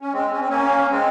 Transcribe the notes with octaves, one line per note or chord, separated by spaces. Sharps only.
C#4
G#3 C4
C#4
C4
A#3 C#4
G#3 C4